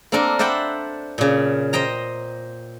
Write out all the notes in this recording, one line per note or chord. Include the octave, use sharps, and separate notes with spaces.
A#3 C4 D4 A4 A#4
C5 D5 E5 F#5 G5 B5
A#2 C#3
C5 D#5 G5 A#5